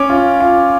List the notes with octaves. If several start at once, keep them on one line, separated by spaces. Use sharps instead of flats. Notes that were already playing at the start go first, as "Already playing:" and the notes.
Already playing: C#4 D6
F4
F4